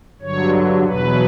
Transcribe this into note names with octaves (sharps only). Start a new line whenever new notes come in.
G2 D3 F#3 C#5
E2 B2 F#3 B4